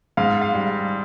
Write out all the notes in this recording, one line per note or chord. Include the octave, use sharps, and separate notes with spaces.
G#2 F5
F5
G3